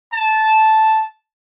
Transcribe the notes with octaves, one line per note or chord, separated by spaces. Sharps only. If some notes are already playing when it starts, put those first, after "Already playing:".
A5